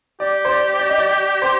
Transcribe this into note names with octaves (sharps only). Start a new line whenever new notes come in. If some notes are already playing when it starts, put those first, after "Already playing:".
G4 D5
C5
D5
D5
D#5
D5
D5
C5